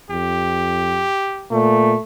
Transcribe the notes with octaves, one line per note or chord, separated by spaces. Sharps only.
F2 G4
A#2 A3